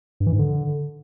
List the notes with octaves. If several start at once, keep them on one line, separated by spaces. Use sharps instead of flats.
G2
E3
G#2
D3